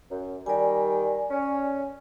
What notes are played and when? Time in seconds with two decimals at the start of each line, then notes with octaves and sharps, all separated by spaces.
0.10 F#2
0.46 D#3 G3 D5 G#5
1.30 C#4